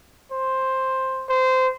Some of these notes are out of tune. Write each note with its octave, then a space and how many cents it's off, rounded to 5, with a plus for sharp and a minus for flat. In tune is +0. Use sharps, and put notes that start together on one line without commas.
C5 +5
C5 -20